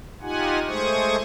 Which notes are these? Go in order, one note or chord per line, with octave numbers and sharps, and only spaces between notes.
D#4 F4 G4 F#5 G#5
G#3 A3 G#4 C5 C#6 D#6